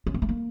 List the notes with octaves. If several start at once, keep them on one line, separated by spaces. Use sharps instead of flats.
C#4
A#3
A3
A#3